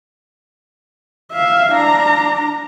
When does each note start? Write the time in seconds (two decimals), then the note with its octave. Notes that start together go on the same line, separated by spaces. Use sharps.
1.32 E5 F5
1.72 D4 A#5